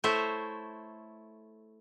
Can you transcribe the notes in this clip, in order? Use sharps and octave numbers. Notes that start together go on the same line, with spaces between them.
A3 E4 C5 C#5 E5